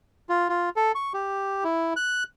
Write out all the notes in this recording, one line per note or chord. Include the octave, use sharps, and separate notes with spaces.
F4
F4
A4
C#6
G4
E4
F#6